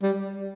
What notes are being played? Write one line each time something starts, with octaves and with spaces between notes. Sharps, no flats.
G3